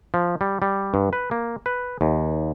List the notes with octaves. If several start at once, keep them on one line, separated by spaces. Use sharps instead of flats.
F3
G3
G3
G2
B4
A#3
B4
D#2